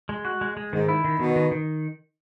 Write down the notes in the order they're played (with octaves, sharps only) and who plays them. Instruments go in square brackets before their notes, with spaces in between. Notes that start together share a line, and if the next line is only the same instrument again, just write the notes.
[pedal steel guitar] G#3
F#4
G#3
G#3
[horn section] G#2 [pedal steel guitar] D#3
[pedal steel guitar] E4
D#3
[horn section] B2 [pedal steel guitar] D#3
[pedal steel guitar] D#3
D#3